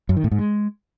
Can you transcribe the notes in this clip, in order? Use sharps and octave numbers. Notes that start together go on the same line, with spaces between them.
F#2
D#3
A2
G#2
G#3